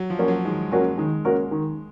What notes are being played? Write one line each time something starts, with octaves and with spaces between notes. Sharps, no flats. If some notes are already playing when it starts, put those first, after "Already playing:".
Already playing: F#3
F3
A#3 C#4 F#4 A#4
F#3
D#3 G#3
F#3 A#3 C#4 F#4 A#4
D#3 G#3
A#3 C#4 F#4 A#4
D#3